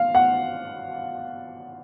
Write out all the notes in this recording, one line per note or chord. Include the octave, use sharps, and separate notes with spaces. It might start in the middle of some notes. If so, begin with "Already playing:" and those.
Already playing: F5
F#5